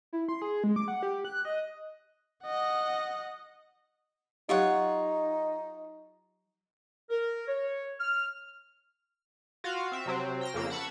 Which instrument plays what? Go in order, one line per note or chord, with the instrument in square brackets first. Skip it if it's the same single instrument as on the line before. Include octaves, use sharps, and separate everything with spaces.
[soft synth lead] E4
C6
G#4
G#3
D6
F#5
G4
F#6
D#5
[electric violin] D#5 F#5
[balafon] F#3 G4 [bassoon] D#4 [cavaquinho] F4 C#5 F#5
[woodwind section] A#4
C#5
F6
[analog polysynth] F4 F#4 F5
C4 E5
C3 F#3 C4
G5 F6 A#6
F2 C#3 A#3 E6 D7
F#5 A5 B5 C#6 E6